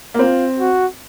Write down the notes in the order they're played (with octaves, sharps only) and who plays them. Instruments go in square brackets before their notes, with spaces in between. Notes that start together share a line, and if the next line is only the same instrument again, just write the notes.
[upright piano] A#3
[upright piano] C4 [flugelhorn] F4
[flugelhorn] F#4